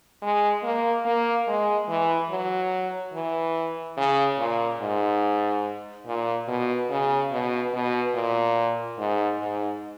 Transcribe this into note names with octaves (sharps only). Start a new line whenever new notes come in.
G#3
A#3
A#3
G#3
E3
F#3
E3
C#3
A#2
G#2
A#2
B2
C#3
B2
B2
A#2
G#2
G#2